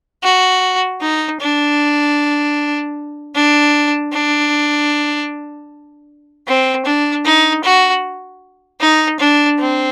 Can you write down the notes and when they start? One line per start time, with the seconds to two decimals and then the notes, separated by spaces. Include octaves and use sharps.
0.23 F#4
1.01 D#4
1.40 D4
3.35 D4
4.13 D4
6.47 C4
6.86 D4
7.25 D#4
7.64 F#4
8.80 D#4
9.20 D4
9.59 C4